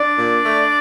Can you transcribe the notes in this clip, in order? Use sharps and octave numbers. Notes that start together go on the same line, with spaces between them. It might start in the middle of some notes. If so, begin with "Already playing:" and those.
Already playing: D4 D5
A#2
A3